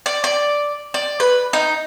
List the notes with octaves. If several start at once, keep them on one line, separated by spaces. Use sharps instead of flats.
D5
D5
D5
B4
D#4